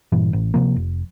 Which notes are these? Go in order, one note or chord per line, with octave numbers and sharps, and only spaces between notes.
G2 A#2 E3
A1
C3 F3 A#3
F1